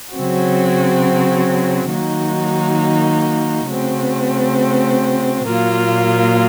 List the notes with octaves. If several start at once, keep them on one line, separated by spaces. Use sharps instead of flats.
C#3 F#3 C4 F#4
D#3 F#3 A#3 D#4 F#4
C#3 A3 C4 F#4
A#2 F#3 A#3 F4